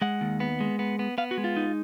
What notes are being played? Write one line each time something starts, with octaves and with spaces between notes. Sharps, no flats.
G#3 F#5
D#2
B3
G#3
B3
B3
B3 F5
F#4
G#3
F4
D#4